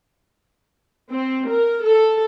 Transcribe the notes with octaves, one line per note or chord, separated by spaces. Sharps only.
C4
A#4
A4